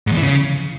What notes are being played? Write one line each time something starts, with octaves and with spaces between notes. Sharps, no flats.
G#2
E2
E3
C#3